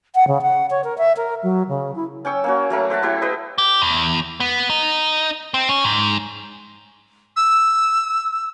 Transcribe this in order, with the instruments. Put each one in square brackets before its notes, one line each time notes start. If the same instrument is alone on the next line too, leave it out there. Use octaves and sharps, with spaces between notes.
[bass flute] F#5
C#3
F#5
C#5
A#4
E5
A#4
F#3
C#3
E4
[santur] C#4 G5 C#6 E6
A#3 C#4 F#4
F#3 A3 A#4 C#6
C5 E5 F#5 A5
E4 G4 C5
G4 B4 D#5
[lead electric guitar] G4
E2
B3
D#4
C4
C#4
G#2
[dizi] E6